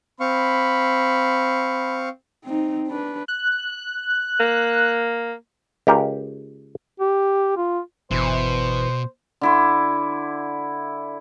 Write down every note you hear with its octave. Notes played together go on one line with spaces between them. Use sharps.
C4 F5 B5 C#6
C4 D#4
D4 B4
F#6
A#3
C#2 G4 A#4 G5
G4
F4
G1 B2 E3 C5
D3 E4 C6